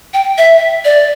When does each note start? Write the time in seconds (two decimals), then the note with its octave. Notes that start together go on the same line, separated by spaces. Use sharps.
0.14 G5
0.38 E5
0.85 D5